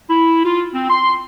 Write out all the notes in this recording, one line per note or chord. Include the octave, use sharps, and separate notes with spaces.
E4
F4
C4
C6